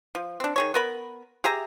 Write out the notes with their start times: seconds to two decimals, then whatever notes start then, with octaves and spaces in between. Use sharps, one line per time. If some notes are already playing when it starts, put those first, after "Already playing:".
0.15 F3
0.40 C4 D4
0.56 D#3 G#4 C#5
0.74 B3 A#4 B5
1.44 G4 G#4 E5 A#5